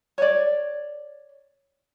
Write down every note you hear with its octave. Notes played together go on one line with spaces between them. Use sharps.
C#5 D5